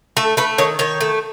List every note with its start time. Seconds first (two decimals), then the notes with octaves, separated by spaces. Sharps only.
0.17 A3 A4
0.37 A3 B4
0.58 D#3 C#5
0.79 D#3 C#5
1.01 A3